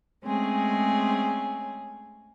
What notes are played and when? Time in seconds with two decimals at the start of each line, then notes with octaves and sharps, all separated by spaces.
0.24 G#3 A3 C4 C#4 G#4